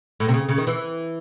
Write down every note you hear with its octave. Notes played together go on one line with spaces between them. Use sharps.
A2
C3
C#3
C#3
D#3
E3